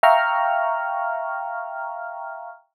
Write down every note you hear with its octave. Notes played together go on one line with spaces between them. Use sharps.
E5 F5 G5 A#5 C#6 F6